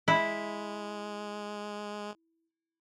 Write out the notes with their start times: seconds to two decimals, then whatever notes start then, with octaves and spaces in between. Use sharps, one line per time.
0.08 G#3 E4